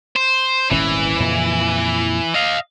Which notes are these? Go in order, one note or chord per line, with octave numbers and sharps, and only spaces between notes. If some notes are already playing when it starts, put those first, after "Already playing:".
C5
D#1 G#1 E3 C#4
F2 A#2 C#3
D#5 F5